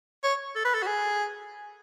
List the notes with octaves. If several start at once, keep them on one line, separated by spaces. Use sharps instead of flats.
C#5
A4
B4
A4
F#4
G#4